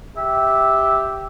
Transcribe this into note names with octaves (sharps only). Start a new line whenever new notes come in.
G4 E5